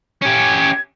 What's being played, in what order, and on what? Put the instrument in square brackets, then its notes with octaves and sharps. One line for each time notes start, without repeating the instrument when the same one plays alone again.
[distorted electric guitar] C#4 G4 [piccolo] G#6